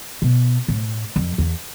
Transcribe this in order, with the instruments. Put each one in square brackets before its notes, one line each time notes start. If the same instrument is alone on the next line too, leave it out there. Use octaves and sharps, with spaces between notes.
[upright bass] B2
A2
F2
E2